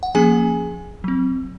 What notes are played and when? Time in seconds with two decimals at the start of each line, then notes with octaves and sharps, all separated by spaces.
0.03 F#5
0.15 F3 A#3 C#4 G#4 G#5
1.04 F#3 C4